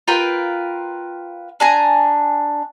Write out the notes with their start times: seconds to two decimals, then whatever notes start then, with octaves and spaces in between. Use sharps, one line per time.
0.08 F4 A#4 B4 G5
1.60 D4 G#5 A#5